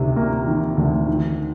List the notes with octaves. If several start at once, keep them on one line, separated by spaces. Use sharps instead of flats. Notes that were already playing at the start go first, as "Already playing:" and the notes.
Already playing: D2 C3 D#3
A#3
D#3
D2
D#3